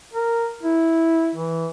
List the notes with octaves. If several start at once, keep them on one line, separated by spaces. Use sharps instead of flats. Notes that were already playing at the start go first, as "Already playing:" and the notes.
A#4
E4
E3